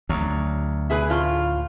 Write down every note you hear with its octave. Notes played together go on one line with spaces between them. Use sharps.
D2 F#3
E4 G#4 B4
A2 F4